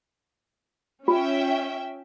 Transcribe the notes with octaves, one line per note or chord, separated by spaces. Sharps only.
C#4 F4 E5 G5